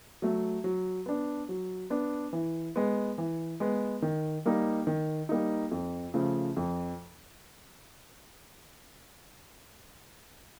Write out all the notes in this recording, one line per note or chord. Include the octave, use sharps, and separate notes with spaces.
F#3 A3
F#3
B3 D4
F#3
B3 D4
E3
G#3 B3
E3
G#3 B3
D#3
G3 A#3 D#4
D#3
G3 A#3 D#4
F2
C#3 F3 A3
F2